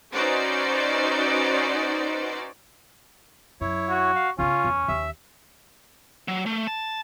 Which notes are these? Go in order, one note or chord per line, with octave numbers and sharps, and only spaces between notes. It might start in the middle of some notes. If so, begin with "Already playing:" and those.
C#4 D#4 F#4 B4 C5 D5
F#2 E4 C#5
F#4
F5
C#3 B3 C#4 F4
E2
D#2 E5
F#3
A3
A5